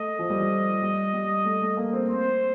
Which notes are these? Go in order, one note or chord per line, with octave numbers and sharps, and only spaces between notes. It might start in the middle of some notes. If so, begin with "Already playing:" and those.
Already playing: A3 D#5
F3
G3
F3
G3
G3
A3
A3
A#3
C4
C4 C5